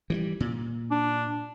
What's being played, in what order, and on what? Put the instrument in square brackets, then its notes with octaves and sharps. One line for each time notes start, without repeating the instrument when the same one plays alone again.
[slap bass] E3 F3 G3
A#2
[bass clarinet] D4